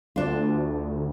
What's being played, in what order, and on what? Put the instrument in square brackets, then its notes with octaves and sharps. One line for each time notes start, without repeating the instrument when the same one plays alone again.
[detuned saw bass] D2 [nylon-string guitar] D4 F4